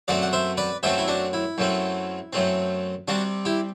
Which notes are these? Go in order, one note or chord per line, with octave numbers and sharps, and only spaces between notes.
F#2 F#3 A3 C4 D5 F#5
F#5
C5 E5
B4 D5
F#2 F#3 A3 C4 C5 E5
E4
D4 F#4
E4
F#2 F#3 A3 C4
F#2 F#3 A3 C4
C3 G3 C4 D4 F#4
E4 G4